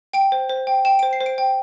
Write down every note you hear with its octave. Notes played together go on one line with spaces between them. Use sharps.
G5 D7
C5
C5
G5
G5 E7
C5 D7
C7
C5
D7
G5